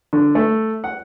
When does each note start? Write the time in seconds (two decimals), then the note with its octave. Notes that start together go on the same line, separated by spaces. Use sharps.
0.13 D3
0.35 A3
0.84 F#5